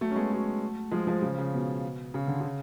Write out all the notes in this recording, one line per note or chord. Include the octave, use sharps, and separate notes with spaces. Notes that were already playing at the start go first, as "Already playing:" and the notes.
F#3 A3
C#4
G#3 B3
F#3 A3
F3 G#3
F3 G#3
C#3 F3
C#3
B2
C#3
D3
C#3